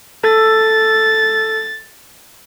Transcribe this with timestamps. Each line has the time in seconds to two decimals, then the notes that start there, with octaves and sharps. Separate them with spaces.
0.24 A4 A6